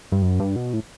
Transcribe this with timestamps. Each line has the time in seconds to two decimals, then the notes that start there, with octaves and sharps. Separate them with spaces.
0.12 G2
0.22 F#2
0.40 G2
0.56 B2
0.73 A2